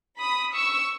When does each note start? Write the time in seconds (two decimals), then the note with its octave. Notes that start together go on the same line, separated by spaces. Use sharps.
0.18 B5 D#6
0.54 C#6 E6